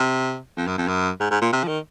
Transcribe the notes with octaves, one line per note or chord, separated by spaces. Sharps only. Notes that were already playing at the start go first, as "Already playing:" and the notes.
Already playing: C3
F2
F#2
F2
F#2
G#2
G#2
A#2
C3
F3
D#3